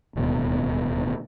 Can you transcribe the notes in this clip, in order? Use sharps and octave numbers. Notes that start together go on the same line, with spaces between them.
D1 D#2 B2